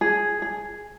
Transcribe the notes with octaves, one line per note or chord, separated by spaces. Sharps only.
G#4
G#4